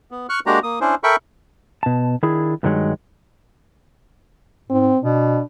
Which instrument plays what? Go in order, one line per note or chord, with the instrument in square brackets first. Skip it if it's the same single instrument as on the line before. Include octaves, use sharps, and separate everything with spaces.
[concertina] B3
C#6 F6 F#6
G#3 A#3 D4 F#4 G4 A#5
A#3 D#6
C#4 D4 E4 C5
A4 A#4 E5 G5 B5 C#6
[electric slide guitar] B2 A5
D#3 D4 E4 G#4
G2 D3 D#3 F#3 G#3
[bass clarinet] G#2 [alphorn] C4
[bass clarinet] B2 [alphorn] D4